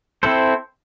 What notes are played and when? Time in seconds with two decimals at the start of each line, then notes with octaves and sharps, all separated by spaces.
0.23 C4 E4 A4 C5